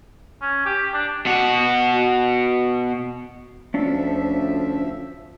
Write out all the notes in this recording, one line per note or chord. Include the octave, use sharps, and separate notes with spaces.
C#4
G4
D4
B2 F#4
D2 F3 C#4 D4 F4 E5